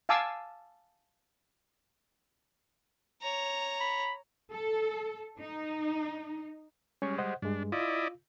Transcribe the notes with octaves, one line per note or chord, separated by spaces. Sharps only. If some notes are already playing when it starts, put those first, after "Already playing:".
F5 G#5 A5 D6 E6
C#5 A#5
B5
A4
D#4
G3 G#3 C#4 C#6
C5 D#5 F#5
G2 G#3 D4
E4 F4 D5 D#5